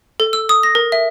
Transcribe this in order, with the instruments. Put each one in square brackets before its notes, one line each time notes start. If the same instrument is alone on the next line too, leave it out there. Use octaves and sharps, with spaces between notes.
[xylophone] A4
E6
D#6
A#6
A#4
E5